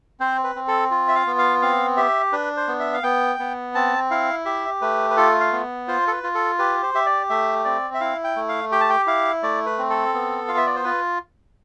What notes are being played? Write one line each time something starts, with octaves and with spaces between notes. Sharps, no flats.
C4 C5
B4
C4
A4
F4
E5
F5
B3
F5
C4 F5
G4 E5
D4 B4
C5
B3
E5
F5
B3 G5
B3
C4 A5
E4 F5
G4 E5
A3 B4
B4
F4 A4
F5
B3
F4 C5
A4
B4
F4
A4
G4 B4
C5
G4 E5
D5
A3 E5
C4 D5
E5
E4 F5
G5
A3
F5
G4 G5
A5
G5
E4 F5
A3 D5
B4
C4
A4
B3
F4 F5
E5
D5
C5
F4 B4